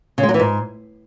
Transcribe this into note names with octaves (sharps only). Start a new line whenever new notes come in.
C#3
G#3
F#3
E3
G#2